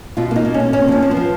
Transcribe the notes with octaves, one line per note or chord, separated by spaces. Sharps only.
B2 F4
A#3 D#4
B2
C#4
A#3
A#3 C#4
F3 C#4
F3
B3
F3